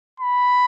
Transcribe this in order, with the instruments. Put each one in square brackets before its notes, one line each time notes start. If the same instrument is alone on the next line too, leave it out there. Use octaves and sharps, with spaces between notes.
[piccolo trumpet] B5